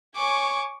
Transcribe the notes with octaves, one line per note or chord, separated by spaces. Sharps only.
C#5 G#5 C#6 D6